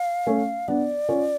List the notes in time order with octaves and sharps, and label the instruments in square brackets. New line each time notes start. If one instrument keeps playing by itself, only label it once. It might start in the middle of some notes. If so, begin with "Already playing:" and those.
Already playing: [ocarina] F5
[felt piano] A3 C#4
[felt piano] B3 D4 [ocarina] D5
[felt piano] C#4 F4